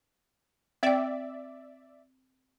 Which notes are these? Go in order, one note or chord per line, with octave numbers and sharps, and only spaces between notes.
C4 D5 E5 G5